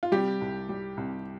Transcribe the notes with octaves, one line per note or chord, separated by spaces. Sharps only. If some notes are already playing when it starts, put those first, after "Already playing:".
F4
C3 G3 G4
C2
G3
C2